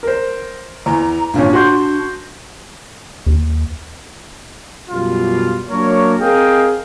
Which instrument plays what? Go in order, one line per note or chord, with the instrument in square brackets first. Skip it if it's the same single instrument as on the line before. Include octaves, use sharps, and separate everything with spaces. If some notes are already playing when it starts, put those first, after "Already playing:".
[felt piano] A#4 C5
[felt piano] E2 [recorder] A#5
[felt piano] G#1 A#2 C#4 [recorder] D4
[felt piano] F#4 C6 G6
[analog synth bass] D#2
[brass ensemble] F#2 B2 G3 F4
F#3 A#3 D4 A#4 C#5
C4 G#4 A#4 D#5 F5 G5